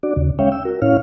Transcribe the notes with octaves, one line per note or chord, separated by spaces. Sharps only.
D4 F#4 D5
D#2 C#3
G#3 C#4 C#5 E5 F5 G5
G5 E6
F#4 A#4
A2 C#4 E4 C#5 F5 F6